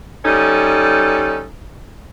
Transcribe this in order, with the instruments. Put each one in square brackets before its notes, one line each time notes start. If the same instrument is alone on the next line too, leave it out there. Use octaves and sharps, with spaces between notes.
[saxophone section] G3 C#4 D#4 A4